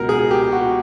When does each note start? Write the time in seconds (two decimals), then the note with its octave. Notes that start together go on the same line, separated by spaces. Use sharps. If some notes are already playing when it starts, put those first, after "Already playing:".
Already playing: C#2 B2 F#3 A#4
0.09 G#4
0.31 G4
0.52 F#4